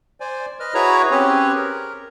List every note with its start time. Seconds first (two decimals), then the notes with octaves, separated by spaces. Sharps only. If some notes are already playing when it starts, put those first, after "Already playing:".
0.20 C5 D5 G#5
0.60 B4 D#5 F6
0.74 E4 F#4 G#4 B4 C#5 A#5
1.11 C4 C#4 G4 G#4 B4 C#5
1.55 A#4